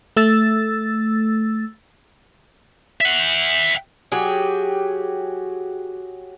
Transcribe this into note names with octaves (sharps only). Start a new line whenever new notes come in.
A3 E6 A6
E5 F#5
F#3 G4 G#4